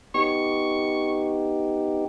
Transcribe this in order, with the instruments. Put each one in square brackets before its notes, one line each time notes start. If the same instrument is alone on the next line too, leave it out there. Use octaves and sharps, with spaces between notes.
[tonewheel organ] B3 D#4 G4 [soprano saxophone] C#6